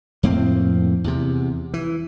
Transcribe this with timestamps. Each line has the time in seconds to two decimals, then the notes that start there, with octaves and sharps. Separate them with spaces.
0.23 F2 A2 A#3 C4
1.04 E2 C3
1.74 E3